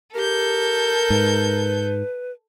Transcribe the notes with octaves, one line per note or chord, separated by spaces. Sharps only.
G4 A4 A#4 G6
G#2 B4